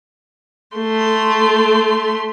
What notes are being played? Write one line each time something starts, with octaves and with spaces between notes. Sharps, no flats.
A3 C6